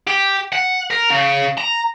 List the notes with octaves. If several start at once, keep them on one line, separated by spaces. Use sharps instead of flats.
G4
F#5
A#4
C#3
A#5